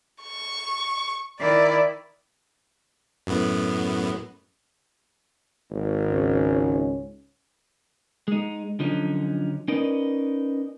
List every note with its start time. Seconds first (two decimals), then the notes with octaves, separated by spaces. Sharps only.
0.22 C#6
1.40 D#3 E4 D5
3.27 F#2 A2 B3
5.71 G#1
6.09 C#2 G#2 C#4
8.28 G#3 D#4
8.80 D3 F3 F#3 C#4 D#4
9.68 C#4 D#4 A#4 B4 D5 D#5